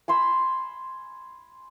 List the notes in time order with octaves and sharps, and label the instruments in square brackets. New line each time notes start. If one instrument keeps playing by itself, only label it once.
[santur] G#5 B5 C6 E6